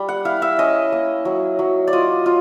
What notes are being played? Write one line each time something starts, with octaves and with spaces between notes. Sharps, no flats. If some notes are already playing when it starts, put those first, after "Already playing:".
Already playing: G3
F#5
E4 F5
E5
C#4 D#5
A#3
F#3
F#3
D5
F4 D#5
F4